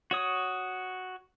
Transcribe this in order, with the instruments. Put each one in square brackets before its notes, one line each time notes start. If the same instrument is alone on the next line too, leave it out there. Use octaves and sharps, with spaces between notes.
[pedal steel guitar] F#4 C#5 D#6